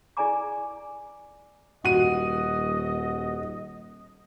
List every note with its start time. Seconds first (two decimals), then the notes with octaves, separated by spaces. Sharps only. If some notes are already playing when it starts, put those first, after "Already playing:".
0.17 E4 G#4 D5 G#5 A#5 D6
1.85 D#1 F#4 D#5 D#7